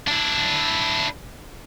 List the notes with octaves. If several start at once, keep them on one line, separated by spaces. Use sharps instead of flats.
D4 E4